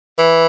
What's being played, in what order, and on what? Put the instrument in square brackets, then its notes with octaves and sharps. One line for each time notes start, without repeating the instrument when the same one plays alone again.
[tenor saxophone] E3